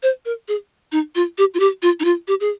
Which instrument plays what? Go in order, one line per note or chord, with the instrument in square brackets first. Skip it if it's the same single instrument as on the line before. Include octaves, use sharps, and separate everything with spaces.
[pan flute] C5
A#4
G#4
D#4
F4
G4
F4
G4
F4
D#4
F4
G4
G#4